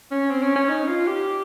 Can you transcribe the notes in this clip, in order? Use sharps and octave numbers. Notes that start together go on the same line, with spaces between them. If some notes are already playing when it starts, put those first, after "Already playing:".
C#4
C4
C#4
C#4
D#4
F4
G4